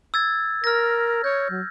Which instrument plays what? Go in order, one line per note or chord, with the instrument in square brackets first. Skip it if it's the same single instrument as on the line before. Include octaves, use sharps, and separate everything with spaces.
[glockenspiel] E6 G#6 A6
[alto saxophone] A#4 [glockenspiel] F6 A#6
[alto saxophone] C#5 [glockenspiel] G6
[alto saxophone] F#3